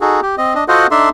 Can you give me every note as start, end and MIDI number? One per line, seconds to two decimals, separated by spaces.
0.01 0.21 63
0.01 0.21 66
0.01 0.21 68
0.01 0.21 69
0.22 0.35 67
0.38 0.55 60
0.38 0.55 75
0.55 0.64 62
0.55 0.64 75
0.68 0.87 65
0.68 0.87 66
0.68 0.87 69
0.68 0.87 72
0.68 0.87 75
0.68 0.87 78
0.91 1.09 62
0.91 1.09 63
0.91 1.09 69
0.91 1.09 74
0.91 1.09 76
0.91 1.09 84